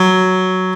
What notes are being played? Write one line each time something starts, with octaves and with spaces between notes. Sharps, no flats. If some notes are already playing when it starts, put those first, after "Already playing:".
Already playing: F#3